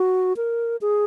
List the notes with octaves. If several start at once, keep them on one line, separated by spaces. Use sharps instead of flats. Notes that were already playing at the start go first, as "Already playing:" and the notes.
Already playing: F#4
A#4
G#4